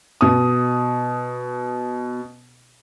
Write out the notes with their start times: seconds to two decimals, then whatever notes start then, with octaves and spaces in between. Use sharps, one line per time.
0.21 B2 D#6